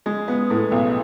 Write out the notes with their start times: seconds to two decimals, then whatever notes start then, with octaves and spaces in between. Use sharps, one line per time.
0.06 G#3
0.28 B3
0.50 A2
0.71 B1